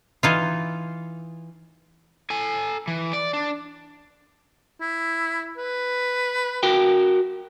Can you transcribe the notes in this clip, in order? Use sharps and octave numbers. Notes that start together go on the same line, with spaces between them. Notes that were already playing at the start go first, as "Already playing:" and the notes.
E3 D#4 F4
A4 G#5
E3
D5
D4
E4
B4
F#4 A#4 G5